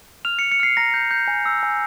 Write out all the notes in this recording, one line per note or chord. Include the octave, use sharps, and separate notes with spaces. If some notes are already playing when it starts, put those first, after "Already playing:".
F6 F7
C#7
F6
C#7
F6 C7
A#5 A#6
G6
G6
G#5
E6
G#5